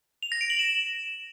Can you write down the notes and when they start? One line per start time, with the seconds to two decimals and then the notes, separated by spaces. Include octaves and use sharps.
0.23 F7
0.32 A#6
0.41 D7
0.50 F#7
0.59 E7